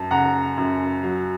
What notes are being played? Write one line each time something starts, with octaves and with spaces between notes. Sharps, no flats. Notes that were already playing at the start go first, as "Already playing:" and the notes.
Already playing: F#2 A5
C#3 F#5 A#5
F#2
F#3